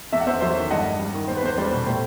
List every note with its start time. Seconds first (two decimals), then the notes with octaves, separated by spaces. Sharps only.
0.12 E2 E5
0.20 F#5
0.26 E2 C5 E5
0.41 F#3 C5 E5
0.56 D#3
0.71 G2 D#5 F#5
0.85 G2
0.99 G3
1.14 D#3
1.28 B3 C5
1.37 B4
1.42 E2 C5
1.58 G3 C5
1.72 B2
1.86 A2 C5